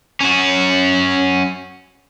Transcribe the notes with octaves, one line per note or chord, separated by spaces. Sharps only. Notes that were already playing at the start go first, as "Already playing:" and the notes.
C#4 F#4